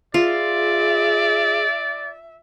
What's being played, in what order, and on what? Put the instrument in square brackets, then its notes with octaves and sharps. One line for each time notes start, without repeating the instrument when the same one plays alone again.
[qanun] F4 [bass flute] G#4 [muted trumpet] D5 [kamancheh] E5